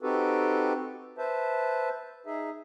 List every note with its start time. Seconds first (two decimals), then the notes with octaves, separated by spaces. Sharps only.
0.02 C4 D#4 F#4 G4 A4 B4
1.18 B4 C5 E5 A5
2.26 D#4 G#4 E5